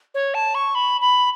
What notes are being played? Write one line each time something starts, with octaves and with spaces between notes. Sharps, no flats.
C#5
A5
C#6
B5
B5